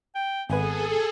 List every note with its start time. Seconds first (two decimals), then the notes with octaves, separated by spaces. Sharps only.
0.15 G5
0.50 G#1 B3 G#4 A4 B4 G#5